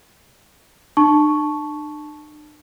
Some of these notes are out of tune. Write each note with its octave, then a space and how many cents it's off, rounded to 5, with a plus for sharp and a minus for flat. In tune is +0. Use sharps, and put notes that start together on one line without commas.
D4 +45 A5 -10 C#6 +0